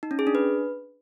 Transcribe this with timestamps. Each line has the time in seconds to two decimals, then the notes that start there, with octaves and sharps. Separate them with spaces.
0.03 D#4
0.11 C#4
0.19 G#4
0.27 D4
0.35 B4